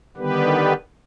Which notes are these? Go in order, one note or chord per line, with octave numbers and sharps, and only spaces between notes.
D3 D#3 G3 B3 G4 B4